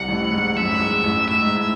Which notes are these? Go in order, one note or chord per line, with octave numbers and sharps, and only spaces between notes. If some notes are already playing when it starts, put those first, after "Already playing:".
Already playing: C2 C3 F#5
A1 A2
A2
G#2
F#2 E5
A2
G#2
A1 A2
A2 E5
G#2
A2